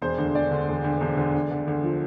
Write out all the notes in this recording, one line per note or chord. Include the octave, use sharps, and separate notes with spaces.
E1 C5
D2
E1 D5
D3
E1
D2
E1
D3
D2
D3
D2
F3